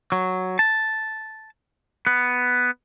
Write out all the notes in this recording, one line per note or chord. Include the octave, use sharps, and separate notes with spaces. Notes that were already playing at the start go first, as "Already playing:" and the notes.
F#3
A5
B3